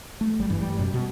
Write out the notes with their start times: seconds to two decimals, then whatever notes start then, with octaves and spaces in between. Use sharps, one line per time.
0.21 A3
0.38 G#1 G3
0.50 G1 G2 E3
0.61 G3
0.79 F#2 B2 G3
0.94 B2